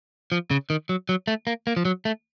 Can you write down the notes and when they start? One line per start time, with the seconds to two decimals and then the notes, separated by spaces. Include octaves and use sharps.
0.32 F3
0.51 C#3
0.70 D#3
0.89 F#3
1.09 F#3
1.28 A3
1.47 A#3
1.67 A#3
1.77 F3
1.85 F#3
2.05 A3